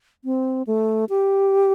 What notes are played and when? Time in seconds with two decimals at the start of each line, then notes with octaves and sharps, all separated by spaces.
0.25 C4
0.67 A3
1.09 G4